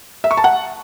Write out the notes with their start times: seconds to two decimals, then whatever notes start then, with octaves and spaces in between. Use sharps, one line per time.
0.24 E5
0.31 C#6
0.37 A5
0.44 F#5